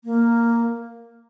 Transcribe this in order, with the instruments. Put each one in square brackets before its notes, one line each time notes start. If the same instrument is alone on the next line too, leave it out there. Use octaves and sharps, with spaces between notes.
[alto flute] A#3